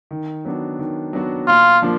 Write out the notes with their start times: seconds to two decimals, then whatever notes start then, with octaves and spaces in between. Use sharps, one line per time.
0.11 D#3
0.45 F#3 B3 D4 F#4
0.79 D#3
1.13 F#3 B3 D4 F#4
1.48 A#2 F4
1.82 F3 A#3 D4